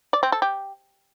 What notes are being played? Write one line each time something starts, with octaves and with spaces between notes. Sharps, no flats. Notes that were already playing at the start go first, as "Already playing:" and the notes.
D5
C4
A4
G4